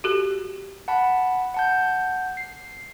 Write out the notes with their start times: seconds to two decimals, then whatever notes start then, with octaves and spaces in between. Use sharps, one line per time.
0.04 F#4 G4 A4
0.88 F#5 A5 B5
1.54 F#5 A5 G6
2.37 C7